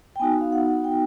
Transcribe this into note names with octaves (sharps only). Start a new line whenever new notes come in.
G5
B3 D#4 F#4 G#5
F5
F#5
F#5
G5